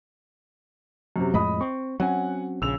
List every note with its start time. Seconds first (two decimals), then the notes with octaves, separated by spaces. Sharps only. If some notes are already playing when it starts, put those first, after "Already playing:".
1.16 F#2 C3
1.34 F2 A2 G#3 D#5 B5 D#6
1.61 C4 C#6
2.00 F#3 C4 C#4 F#5 G#5
2.62 A#1 C#3 E6 F7